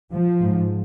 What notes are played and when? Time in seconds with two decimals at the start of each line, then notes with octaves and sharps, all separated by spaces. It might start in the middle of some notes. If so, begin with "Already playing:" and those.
0.12 F3
0.40 G#2